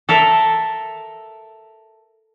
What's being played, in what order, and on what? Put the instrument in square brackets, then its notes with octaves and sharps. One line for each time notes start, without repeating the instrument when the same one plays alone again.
[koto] A4 A#4 E5